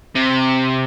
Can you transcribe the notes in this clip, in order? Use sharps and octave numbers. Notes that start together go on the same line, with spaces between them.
C3